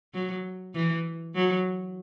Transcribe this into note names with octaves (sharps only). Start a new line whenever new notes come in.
F#3
E3
F#3